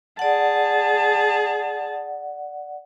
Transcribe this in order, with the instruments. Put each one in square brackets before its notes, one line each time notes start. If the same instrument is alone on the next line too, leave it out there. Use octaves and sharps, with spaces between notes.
[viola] G#4 A5 [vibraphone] D5 F#5